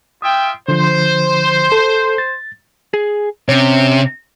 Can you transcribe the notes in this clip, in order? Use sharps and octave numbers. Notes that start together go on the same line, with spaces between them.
F4 E5 G5 D#6
D3 F3 C5
A4
A6
G#4
C3 C#4 C#5